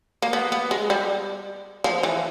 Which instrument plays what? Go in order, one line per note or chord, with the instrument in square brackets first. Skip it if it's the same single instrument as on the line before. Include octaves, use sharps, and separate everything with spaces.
[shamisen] A#3
B3
B3
G#3
G3
F3
E3